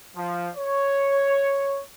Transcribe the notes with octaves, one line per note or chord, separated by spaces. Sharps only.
F3
C#5